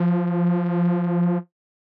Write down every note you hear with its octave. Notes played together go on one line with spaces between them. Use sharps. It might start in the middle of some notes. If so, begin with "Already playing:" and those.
Already playing: F3